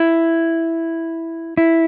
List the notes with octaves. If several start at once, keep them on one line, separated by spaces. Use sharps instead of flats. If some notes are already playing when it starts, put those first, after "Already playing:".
Already playing: E4
E4